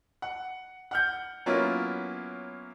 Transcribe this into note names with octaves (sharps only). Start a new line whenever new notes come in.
F#5
F#5 F6 G6
F#3 A#3 B3 C#4 E4 F4